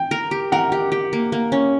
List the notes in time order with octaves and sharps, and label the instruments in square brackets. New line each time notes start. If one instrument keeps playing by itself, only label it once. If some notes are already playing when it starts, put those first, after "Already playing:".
Already playing: [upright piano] G5
[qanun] A#4
G4
[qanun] A#4 [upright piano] F#5
[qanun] G4
G4
A#3
A#3
C#4